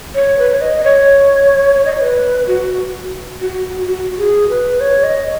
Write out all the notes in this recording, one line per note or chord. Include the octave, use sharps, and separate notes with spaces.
C#5
B4
C#5
D#5
C#5
D#5
C#5
B4
F#4
F#4
F#4
G#4
B4
C#5
D#5